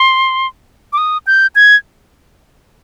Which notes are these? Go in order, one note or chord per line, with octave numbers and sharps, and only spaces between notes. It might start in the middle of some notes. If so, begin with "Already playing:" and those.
Already playing: C6
D6
D#6
G6
G#6